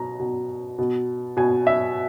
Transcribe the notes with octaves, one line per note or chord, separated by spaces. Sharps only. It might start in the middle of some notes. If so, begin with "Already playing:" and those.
Already playing: B2 A#5
B2
B2
B2 G#5
E5